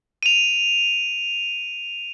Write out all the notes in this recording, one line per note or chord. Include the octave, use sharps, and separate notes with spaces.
D#7 F7